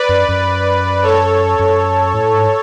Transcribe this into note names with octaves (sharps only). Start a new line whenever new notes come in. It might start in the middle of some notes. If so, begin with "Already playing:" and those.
Already playing: B4 D5
F#2
F#2
A4 C#5
F#2
A2
G#2